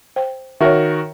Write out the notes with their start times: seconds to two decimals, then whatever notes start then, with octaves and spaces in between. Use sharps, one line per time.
0.16 C5 G5
0.60 D#3 F#4 A#4 C#5 E5